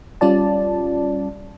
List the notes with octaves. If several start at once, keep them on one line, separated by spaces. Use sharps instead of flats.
G3 C#4 F4 D5 A5